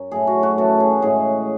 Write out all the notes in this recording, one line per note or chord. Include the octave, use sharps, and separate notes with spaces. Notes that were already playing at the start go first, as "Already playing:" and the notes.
Already playing: F#2
A2 F#3 A3 G#4
F#4
F#4
F#2 C#3 E3 A4
G#4
A2 G#3 G#4